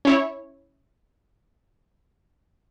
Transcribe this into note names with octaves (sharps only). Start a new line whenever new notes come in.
C#4 E4 C#5